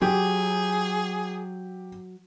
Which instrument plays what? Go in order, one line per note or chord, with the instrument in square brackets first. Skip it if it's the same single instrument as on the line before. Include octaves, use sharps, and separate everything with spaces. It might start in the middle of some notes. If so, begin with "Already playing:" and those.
[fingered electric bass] F#3 [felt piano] G4 [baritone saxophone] G#4